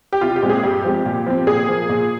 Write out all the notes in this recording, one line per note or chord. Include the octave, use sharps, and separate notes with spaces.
G4
C2 F4
G4
A#2 G#3 C4
G#4
G2 G4
F3 G#3 C4
A#2
F3 C4
A#2 G#4
F3 A#3
A#2